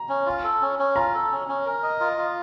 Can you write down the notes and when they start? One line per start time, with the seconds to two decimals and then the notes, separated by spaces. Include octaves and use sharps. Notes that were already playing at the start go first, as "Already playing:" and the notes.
Already playing: A#5
0.09 C#4
0.26 F4
0.44 A4
0.61 C#4
0.79 C#4
0.96 F4 A#5
1.14 A4
1.31 C#4
1.48 C#4
1.66 A#4
1.83 D#5
2.00 F4
2.18 F4